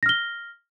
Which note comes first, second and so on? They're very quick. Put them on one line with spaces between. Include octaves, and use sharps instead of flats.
A#6 F6 G7